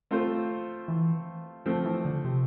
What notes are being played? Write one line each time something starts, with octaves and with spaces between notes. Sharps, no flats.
A3 C4 F4 A4 C5
E3
F3 A3 C4
E3
D3
C3